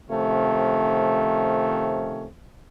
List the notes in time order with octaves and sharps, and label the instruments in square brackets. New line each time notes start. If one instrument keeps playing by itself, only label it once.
[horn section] C3 D#3 F3 A3 C#4